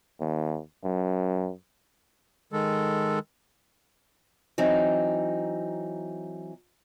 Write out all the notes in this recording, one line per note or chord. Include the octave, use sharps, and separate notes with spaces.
D#2
F#2
D#3 G#3 A4
E3 F#3 C4 D#4